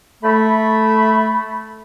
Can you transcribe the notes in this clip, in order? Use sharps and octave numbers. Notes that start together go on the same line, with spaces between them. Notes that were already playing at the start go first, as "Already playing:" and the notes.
A3 B5